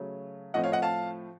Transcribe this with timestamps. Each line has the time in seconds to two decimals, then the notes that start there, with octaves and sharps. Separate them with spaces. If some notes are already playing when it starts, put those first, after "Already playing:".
Already playing: C#3 F#3 A3
0.54 A2 F3 A3 C4 D#5 F#5
0.64 C#5 F5
0.72 D#5 F#5
0.82 F5 A5